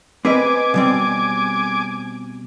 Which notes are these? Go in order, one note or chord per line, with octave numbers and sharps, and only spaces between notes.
C4 B4 D#5 G#5 D6
B2 G3 C4